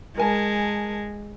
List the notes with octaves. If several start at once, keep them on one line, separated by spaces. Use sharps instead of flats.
G#3 A#4 G#5 A5